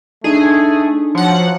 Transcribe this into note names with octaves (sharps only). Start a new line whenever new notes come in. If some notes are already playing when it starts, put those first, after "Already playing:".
A3 D4 D#4 G#4
F3 F#3 F#5